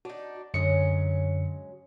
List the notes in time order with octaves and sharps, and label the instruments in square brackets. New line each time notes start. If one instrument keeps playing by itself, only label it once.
[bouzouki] D4 D#4 [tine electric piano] F#4
[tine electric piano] F#2 D3 C#7 [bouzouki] F#3 G#3 C#4